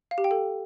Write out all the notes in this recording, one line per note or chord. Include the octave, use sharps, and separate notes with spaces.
F5
G4
G5
A4